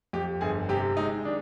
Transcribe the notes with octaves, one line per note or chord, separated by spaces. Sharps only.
F2 G4
G1 G#4
C3 G4
G#3 D#4
D#3 D4